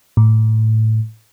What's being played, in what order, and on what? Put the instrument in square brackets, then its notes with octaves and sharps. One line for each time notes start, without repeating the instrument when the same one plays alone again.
[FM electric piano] A2